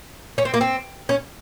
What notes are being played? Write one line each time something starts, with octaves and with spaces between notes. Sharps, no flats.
C#4
C4
A#3
C4
C#4